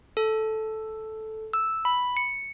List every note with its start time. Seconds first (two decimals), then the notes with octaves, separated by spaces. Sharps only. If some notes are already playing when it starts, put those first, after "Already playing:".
0.17 A4
1.54 E6
1.85 B5
2.17 C#7